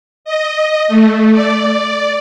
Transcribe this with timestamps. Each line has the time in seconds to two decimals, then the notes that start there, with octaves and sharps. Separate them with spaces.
0.25 D#5
0.88 A3
1.32 D5